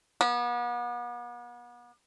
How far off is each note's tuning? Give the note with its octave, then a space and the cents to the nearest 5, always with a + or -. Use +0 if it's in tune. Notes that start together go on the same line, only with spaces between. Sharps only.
B3 -40